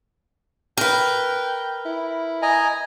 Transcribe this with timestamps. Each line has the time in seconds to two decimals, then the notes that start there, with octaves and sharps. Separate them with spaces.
0.77 A#4 B4 G5
1.85 E4
2.42 D#5 G#5 A#5